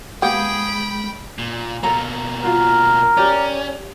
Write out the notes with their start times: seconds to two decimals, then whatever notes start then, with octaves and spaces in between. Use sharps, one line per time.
0.22 G#3 A#3 B3 G4 G#4 G5 B5
1.39 A#2
1.83 B2 A#3 A4 A#5
2.43 F4 F#4 A#4
3.17 C#4 G4 D5